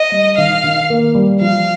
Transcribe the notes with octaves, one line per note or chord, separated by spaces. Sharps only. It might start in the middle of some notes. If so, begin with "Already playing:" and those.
Already playing: D#5
G3
D#3 F5
D#3
A#3
G3
F3 F5